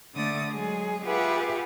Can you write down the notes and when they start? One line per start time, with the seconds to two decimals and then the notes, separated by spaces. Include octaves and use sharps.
0.13 D3 A3 D5 D#6 A6
0.51 F#3 G#3 G#4
1.05 F4 G4 G#4 B4 E5 F#5